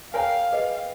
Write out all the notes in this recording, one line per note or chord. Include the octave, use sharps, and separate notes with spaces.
A#4 C#5 F5 G5 G#5
G#4 B4 D#5